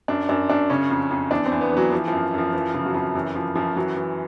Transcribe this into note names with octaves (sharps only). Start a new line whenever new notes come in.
F#2 D4
F#2 D4
F#2 D4
C#3 C#4
F2
F2
E2 D4
C4
E2
B3
E3 F#3
E3 F3
F#2 F3
F#2 F3
E3 F3
C#3 F3
F#3
F2 F3
F#2 E3
F#2 F3
F#2 F3
E3 F#3
E3